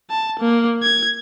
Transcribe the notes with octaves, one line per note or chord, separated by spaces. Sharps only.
A5
A#3
G#6